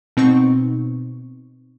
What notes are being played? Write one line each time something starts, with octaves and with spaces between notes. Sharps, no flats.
B2 C4 D#4 C#6